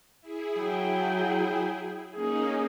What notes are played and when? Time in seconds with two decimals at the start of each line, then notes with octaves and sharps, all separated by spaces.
0.21 E4 G#4
0.58 F#3 G5
2.14 A#3 C#4 D#4 G#4